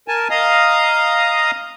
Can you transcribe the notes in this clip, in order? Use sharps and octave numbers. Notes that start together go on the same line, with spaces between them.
A#4 G#5 A5
D#5 F5 A#5 D#6